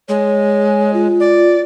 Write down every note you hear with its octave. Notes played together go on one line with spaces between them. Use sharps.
G#3 C#5
F4
D5